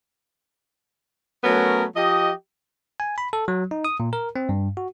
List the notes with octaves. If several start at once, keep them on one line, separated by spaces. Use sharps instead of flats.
F#3 A3 B3 C#4 A#4
F3 G4 D#5
G#5
B5
A4
F#3
D#4
D#6
A#2
A#4
C4
G2
F#4